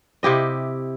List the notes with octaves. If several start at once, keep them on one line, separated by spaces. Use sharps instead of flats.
C3 E4 G4 D#5